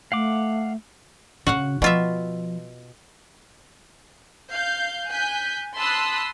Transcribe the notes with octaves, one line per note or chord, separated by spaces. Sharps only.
A3 F5 F#5 D6
C#3 F#4 F5 F#5
B2 F3 F4 E5
F5 G6
G#5 F#6 G6 B6
A5 B5 C6 D#6 E6 F#6